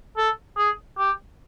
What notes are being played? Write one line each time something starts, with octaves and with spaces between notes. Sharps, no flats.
A4
G#4
G4